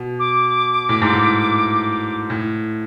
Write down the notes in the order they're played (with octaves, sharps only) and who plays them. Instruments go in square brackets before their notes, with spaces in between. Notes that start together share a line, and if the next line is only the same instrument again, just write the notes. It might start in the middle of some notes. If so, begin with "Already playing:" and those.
Already playing: [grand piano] B2
[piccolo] D6
[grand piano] A2
G#2
A2
A2